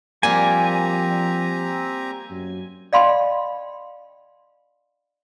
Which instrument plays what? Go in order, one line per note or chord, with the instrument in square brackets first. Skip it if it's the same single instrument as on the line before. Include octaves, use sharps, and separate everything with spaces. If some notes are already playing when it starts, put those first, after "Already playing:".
[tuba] F3 [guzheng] G3 A#3 [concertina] C4 G4 A#5 [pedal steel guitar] G#5
[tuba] F#2
[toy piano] D5 D#5 F5 G5 B5 C6